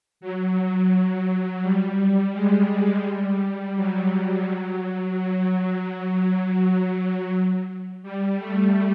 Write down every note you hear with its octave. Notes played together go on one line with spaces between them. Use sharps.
F#3
G3
G#3
G3
F#3
F#3
G3
A3